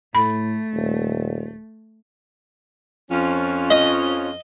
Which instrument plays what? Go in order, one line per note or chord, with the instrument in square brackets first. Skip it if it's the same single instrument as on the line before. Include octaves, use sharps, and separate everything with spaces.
[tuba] A2 [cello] A3 [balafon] B5
[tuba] D#1
[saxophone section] F2 F3 C#4
[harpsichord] D#5